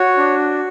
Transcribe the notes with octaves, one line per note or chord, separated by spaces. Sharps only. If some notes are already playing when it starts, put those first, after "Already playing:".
Already playing: F#4 C#5
D4